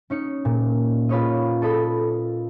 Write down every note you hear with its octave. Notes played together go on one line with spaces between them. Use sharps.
C#4 D#4 C#7
A#2
F4 B4 C#5 D#5
A4 D#5 B5